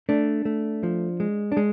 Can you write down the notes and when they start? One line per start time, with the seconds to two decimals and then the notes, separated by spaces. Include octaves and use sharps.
0.09 A3 D4
0.45 A3
0.83 F3
1.20 G#3
1.52 D4
1.57 G#3